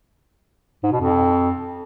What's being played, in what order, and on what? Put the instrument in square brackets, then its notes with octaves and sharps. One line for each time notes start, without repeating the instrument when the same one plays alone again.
[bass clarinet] G#2
B2
F2